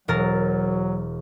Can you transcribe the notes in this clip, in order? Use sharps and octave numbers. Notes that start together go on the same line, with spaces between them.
E1 F#3 A#4 A6